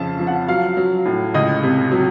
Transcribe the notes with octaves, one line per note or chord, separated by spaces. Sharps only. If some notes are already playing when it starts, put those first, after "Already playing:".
Already playing: F2 C#3 F3 A5
F3
F#5
F#3 F5
F#3
A2
C#2 D#5
C3
F#3